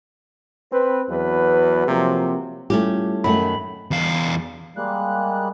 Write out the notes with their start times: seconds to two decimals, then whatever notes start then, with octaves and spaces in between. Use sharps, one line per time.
0.72 C4 B4
1.10 E2 F#3 B4
1.88 C3 F3 F#3 A#3
2.70 G3 A3 C#4 E4 F4 G4
3.24 F#2 D#3 A3 B5
3.91 E2 F5
4.77 G3 G#3 A#3 F#6